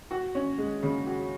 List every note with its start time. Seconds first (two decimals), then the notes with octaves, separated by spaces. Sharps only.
0.11 F#4
0.35 C#4
0.58 G#3
0.83 C#3
1.06 F#4